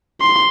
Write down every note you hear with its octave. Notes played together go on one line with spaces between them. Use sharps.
C6